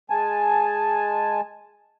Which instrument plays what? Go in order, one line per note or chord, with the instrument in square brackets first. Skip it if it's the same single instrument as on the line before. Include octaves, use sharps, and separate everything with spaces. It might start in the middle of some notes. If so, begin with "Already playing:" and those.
[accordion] G#3 G#5 A5